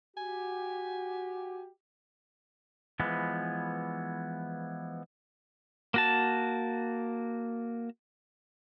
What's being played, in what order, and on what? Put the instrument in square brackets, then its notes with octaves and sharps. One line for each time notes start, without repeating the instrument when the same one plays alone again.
[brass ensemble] F#4 G4 [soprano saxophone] G#5
[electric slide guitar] E3 F3 G#3 B3
[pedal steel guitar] A#3 F#4 A5